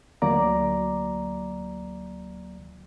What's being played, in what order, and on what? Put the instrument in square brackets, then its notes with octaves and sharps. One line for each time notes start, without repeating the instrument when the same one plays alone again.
[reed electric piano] D2 F#3 A#3 D5 A#5 D6